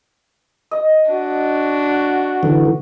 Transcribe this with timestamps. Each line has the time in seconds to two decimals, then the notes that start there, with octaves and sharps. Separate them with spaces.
0.71 D#5
1.11 D4 F#4
2.43 D3 E3